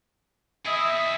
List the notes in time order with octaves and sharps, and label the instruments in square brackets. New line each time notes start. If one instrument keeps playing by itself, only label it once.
[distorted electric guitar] E4 G#4 [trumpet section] D#5 E5